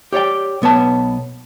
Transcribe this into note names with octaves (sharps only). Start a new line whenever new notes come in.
G4 C#5 D5 G5
B1 B3 C#5 A5